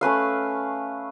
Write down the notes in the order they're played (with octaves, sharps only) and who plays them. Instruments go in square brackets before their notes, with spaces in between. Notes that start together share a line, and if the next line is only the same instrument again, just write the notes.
[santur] A3 C#4 B4 F5